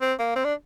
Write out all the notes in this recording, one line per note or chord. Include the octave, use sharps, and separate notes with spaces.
C4
A#3
C4
D4